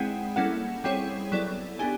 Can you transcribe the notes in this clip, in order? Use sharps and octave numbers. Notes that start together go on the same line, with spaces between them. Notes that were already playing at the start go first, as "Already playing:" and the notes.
Already playing: G#3 C4 E4 G#4 F#5 G5
G3 A#3 C#4 E4 A4 F#5
G3 C4 E4 G#4 C#5 G5
F#3 B3 E4 A4 D5
B3 D4 G4 G#5